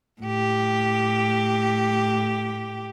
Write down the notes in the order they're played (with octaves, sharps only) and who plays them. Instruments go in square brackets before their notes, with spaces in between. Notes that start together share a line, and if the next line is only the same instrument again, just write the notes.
[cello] A2 G4